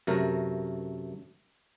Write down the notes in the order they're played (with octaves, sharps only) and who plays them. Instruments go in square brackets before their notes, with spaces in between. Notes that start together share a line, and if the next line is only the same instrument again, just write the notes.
[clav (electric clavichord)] F#2 C3 A3 A#4